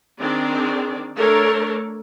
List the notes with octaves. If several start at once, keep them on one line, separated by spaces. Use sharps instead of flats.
D#3 C4 D4 G#4 D5
A3 D4 A4 A#4 C#5